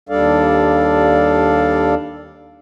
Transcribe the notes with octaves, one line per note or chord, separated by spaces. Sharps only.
D#2 G3 D4 A4 D5 F5